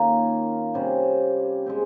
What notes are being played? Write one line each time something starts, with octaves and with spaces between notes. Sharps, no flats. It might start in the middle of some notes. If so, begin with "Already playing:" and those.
Already playing: D#3 A#3 C#4 F4
C3 G3 C#4 G4
G#3 C4 G4